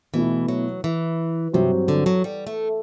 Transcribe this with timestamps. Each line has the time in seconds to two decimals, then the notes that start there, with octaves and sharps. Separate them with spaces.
0.14 B2 E3 A3 E4
0.48 F#3
0.84 E3
1.53 G2 C3 F#3 C4 F#4
1.88 D3
2.06 F#3
2.24 G3
2.47 A3